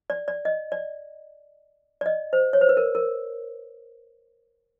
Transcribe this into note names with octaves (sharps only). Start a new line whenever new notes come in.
D5
D5
D#5
D5
D5
D#5
C5
C#5
C5
B4
A#4
A#4